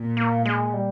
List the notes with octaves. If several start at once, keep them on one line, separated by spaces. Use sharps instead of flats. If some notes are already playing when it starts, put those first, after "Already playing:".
Already playing: A#2
A#3
G#3
G3